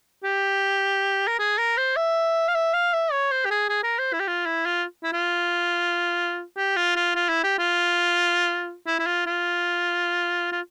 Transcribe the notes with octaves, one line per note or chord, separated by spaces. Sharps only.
G4
A#4
G#4
A#4
C5
E5
F5
E5
F5
E5
C#5
C5
G4
G#4
G#4
A#4
C5
E4
G4
F4
E4
F4
E4
F4
G4
F4
F4
F4
E4
G4
F4
E4
E4
F4
F4
F4